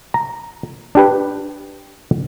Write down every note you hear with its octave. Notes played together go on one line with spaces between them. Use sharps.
A#5
D4 G4 B4